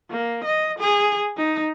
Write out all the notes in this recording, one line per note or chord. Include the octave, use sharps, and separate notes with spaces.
A#3
D#5
G#4
D#4